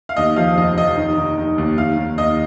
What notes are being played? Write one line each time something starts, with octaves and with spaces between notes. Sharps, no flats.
F5
D#2 D#5
F3 F5
F1 D#5
F1 D#5
D#3
D#3
D#3
D#2
D#2 F5
D#2
D#2 D#5